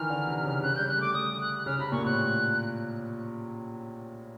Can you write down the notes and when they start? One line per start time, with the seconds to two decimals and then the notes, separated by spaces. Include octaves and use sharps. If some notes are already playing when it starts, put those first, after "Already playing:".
Already playing: D#3 E3 F6
0.10 D3
0.27 C3
0.45 C#3
0.63 C#3 F#6
0.76 G3 G6
0.88 F#6
0.98 A3
1.01 D6
1.14 G3 D#6
1.41 F#6
1.59 F#6
1.66 C#3 F6
1.79 C3 B5
1.92 A#2 C#6
2.05 A2 F#6